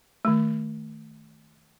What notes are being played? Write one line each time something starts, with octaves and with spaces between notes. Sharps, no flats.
D#3 A3